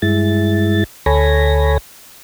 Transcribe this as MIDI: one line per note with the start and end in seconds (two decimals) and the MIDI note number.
0.02 0.84 43
0.02 0.84 56
0.02 0.84 64
0.02 0.84 93
1.06 1.78 38
1.06 1.78 69
1.06 1.78 73
1.06 1.78 80
1.06 1.78 83
1.06 1.78 94